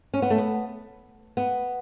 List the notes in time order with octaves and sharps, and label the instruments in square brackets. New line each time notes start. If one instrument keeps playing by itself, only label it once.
[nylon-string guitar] C#4
B3
A3
B3
B3